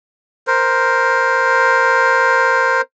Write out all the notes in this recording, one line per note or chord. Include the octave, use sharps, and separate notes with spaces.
A#4 C5